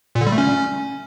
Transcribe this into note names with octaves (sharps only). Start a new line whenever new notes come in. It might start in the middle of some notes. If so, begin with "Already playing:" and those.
A#2
D3
G3
A3
C#4